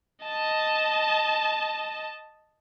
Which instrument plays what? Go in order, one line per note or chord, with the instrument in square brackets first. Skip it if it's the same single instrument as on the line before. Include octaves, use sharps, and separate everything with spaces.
[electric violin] D#5 A5